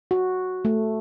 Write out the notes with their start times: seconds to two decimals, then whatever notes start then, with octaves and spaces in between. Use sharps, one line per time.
0.11 F#4
0.65 A3